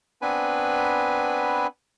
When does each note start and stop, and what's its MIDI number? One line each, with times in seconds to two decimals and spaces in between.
0.22 1.67 59
0.22 1.67 60
0.22 1.67 62
0.22 1.67 71
0.22 1.67 80
0.22 1.67 83